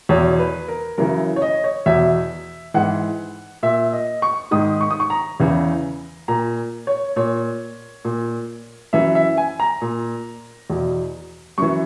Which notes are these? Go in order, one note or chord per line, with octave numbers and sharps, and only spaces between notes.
E2 B2 C#5
B4
A#4
F#2 C#3 E3 A#4
C#5
D#5
C#5
E2 B2 E5
G#2 E3 F#5
A#2 E5
D#5
C#6
G#2 D#3 D#6
C#6
D#6
C#6
A#5
E2 C#3 E3
A#2 A#5
C#5
A#2 C#5
A#2
F#2 E3 E5
E5
G#5
A#5
A#2
E2 B2
F#2 E3 C#6